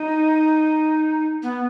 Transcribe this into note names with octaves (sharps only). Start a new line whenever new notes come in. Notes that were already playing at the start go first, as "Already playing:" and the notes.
Already playing: D#4
B3